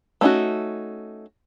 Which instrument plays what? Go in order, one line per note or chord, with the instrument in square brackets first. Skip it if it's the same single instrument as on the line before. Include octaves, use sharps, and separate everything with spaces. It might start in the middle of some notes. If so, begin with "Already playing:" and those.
[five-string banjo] A3 C#4 D#4 F4 F#4